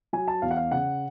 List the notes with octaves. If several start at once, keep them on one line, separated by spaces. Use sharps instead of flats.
F#3 G#5
A5
E2 F5
F#5
F5
C#3 F#5